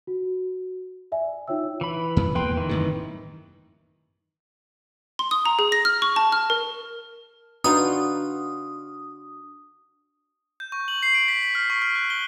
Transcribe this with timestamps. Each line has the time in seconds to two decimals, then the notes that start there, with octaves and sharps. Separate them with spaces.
0.07 F#4
1.12 D5 E5 G#5
1.48 D#4 F4 C#5 G5 E6
1.81 E3 B5
2.17 F#2
2.35 E2 A#3 B4 G5 C6
2.57 D#3 E3
2.69 F#2 A2 C3
5.19 C6
5.31 D#6
5.45 A#5
5.59 G#4
5.72 A#6
5.85 F6
6.02 C#6
6.16 A5
6.32 F6
6.50 A#4
7.64 B3 D4 D#4 F4 F#4 D#6
10.60 G6
10.72 C#6
10.88 F#7
11.03 C7
11.14 D7
11.28 B6
11.43 B6
11.55 F6
11.70 C#6
11.82 F6
11.95 F#6
12.10 G7